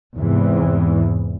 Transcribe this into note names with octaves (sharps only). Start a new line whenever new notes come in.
E2 G#2 C3 E3